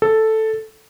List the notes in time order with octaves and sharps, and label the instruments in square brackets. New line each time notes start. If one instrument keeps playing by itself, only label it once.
[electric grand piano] A4